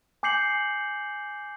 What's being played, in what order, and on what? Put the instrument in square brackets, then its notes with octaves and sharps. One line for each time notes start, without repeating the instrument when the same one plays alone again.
[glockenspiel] G#5 D6 G6 C7 C#7 F#7